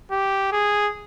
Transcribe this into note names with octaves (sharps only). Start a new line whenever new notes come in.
G4
G#4